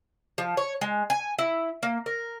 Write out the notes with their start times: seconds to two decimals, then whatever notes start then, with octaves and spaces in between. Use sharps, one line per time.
0.38 F3
0.57 C#5
0.81 G#3
1.10 G#5
1.39 E4
1.83 A#3
2.06 A#4